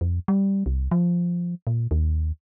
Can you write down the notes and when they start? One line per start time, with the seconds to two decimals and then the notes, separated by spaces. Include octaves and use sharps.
0.01 F2
0.28 G3
0.66 C2
0.91 F3
1.67 A#2
1.91 D#2